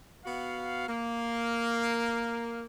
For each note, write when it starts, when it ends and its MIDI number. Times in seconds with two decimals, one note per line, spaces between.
0.25 0.85 59
0.25 0.85 66
0.25 0.85 77
0.88 2.64 58